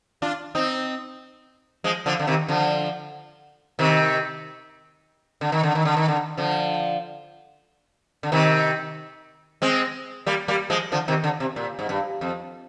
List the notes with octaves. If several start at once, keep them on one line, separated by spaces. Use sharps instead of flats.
D4 F4
C4 D#4
F3 G#3
D3 F3
D3
C3 D#3
D3 F3
C3 D#3
D3
D#3
D3
D#3
D3
D#3
D3
D3 F3
D3
C3 D#3
G#3 C4
G3 A#3
G3 A#3
F3 G#3
D3 F3
C3 D#3
D3
C3
A#2
G#2
G2
F2